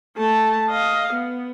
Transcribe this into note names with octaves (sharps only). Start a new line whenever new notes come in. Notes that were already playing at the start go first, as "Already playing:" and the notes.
A3 A5
D#5 F5
B3